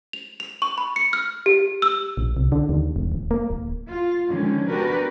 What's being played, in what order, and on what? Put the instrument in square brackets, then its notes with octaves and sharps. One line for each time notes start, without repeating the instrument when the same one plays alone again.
[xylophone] F7
F7
C#6
B5
C#7
F6
G4
E6
[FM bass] A#1
C2
D3
D#2
E1
D1
A#3
D1
[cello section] F4
D3 D#3 F3 G#3 C#4
B3 D4 F#4 G4 A#4 B4